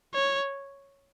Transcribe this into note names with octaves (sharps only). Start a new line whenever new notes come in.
C#5